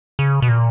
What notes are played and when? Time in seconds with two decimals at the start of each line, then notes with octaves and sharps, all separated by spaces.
0.19 C#3
0.42 B2
0.49 A#2